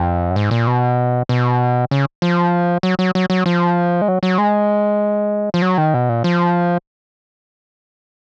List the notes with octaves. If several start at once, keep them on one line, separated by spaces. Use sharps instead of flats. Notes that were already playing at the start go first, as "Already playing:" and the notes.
Already playing: F2
F#2
G#2
A#2
B2
B2
C#3
F3
F#3
F#3
F#3
F#3
F3
G#3
F#3
F#3
G#3
F3
F#3
D#3
B2
A#2
F3